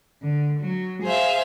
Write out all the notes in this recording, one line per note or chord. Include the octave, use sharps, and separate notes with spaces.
D3
F#3
G#4 C5 E5 F5